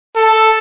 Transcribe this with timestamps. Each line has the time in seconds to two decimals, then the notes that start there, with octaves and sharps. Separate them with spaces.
0.15 A4